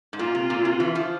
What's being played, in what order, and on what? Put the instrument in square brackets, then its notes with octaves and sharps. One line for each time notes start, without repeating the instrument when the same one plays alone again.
[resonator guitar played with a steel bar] G#2
[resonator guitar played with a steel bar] A#2 [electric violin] F4
[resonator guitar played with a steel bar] C3
A#2
C3
E3
F3